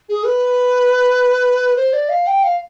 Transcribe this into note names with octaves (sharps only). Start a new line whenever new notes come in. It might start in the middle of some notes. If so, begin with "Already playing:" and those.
G#4
B4
C5
D5
F5
G5
F5